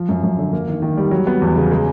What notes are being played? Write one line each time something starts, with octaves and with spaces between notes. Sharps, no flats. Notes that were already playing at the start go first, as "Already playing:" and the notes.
Already playing: F3
F#2
F#2
D3
A#3
D#3
D#3
G3
F#3
B3
E2
C#3
G#3